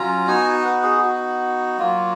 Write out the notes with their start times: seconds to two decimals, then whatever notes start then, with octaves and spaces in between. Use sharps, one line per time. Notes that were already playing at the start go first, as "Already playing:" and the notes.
Already playing: F#3 C#4 F4 A#5
0.27 B3 D#4 F#4 G#5
0.65 B4
0.83 G#4
1.02 F#4
1.78 F#3 A#3 F4